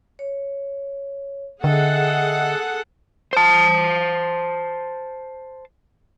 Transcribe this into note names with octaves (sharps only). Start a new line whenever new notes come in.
C#5
D3 G#4 A4 D#5 E5 F#5 G5
C5 A5